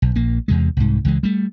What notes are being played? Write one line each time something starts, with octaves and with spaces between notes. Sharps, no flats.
B1
A#1 A#3
E2 C3 G#3
C2 G#2
C#2 E3 G#3
G3 A3